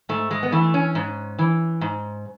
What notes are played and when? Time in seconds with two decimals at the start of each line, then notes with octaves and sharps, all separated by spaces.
0.09 G#2 A3
0.31 G#3
0.43 B3
0.52 E3 A3
0.74 C#4
0.95 G#2
1.39 E3
1.81 G#2